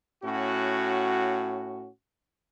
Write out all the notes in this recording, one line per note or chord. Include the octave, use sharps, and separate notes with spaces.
A2 C#4 F#4